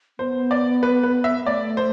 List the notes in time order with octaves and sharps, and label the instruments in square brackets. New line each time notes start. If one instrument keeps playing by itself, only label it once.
[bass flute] B3 [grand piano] C5
[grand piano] D5
B4
B4
E5
[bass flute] A3 [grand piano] D5
[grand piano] C5